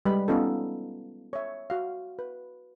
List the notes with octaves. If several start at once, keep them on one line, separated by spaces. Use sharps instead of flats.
G3 G#3 B4 D#5 B5
B3 C#4 D#4 F4 A4
C#5 E5
F#4 F5
B4